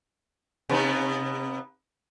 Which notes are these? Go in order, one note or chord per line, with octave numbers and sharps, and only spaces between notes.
C3 B3 D#4